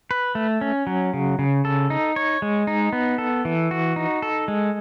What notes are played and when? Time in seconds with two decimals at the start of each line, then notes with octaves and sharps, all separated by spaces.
0.11 B4
0.35 A3
0.61 C#4
0.87 F#3
1.14 C#3
1.39 C#3
1.65 A4
1.90 D#4
2.16 C#5
2.42 G#3
2.67 D#4
2.93 B3
3.18 A4
3.45 E3
3.71 F#4
3.96 D#4
4.22 A4
4.48 G#3